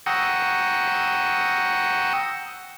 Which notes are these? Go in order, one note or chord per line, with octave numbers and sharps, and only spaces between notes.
F#5 G5 A#5 C#6 D#6 E6